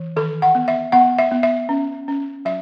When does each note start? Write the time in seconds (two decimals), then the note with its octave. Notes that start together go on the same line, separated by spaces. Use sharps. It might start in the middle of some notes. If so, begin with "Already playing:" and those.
Already playing: E3
0.16 D#3 A4
0.42 F#5
0.55 B3
0.68 E5
0.92 B3 F#5
1.18 E5
1.31 B3
1.43 E5
1.69 C#4
2.08 C#4
2.45 F#3 E5